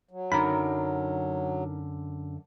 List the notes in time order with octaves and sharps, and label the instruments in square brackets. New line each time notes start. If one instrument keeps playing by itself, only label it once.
[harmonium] F#3
[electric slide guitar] F#2 D3 [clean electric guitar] D#4 A#4 A#5 [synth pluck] B5